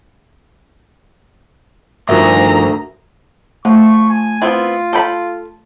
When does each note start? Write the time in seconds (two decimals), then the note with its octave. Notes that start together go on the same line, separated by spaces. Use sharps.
2.09 D2 G2 D#3 F3 F#4 A#4 E5 A#5
3.65 F3 A3 C#6
4.09 G#5
4.42 B3 C4 E4 F4
4.93 A4 G5 B5